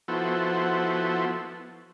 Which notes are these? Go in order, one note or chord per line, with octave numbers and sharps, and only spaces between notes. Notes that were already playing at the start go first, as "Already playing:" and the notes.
F3 B3 E4 F#4 A4 C5